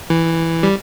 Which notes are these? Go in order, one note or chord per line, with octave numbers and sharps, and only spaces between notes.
E3
G3